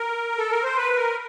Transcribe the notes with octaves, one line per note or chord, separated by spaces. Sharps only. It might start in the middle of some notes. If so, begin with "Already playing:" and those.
Already playing: A#4
A4
A#4
C5
B4
A#4